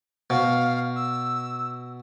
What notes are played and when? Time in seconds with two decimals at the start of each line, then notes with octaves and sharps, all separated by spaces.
0.30 B2 F5
0.95 E6